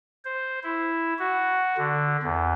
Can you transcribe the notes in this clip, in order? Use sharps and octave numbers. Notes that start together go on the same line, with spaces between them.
C5
E4
F#4
D3
E2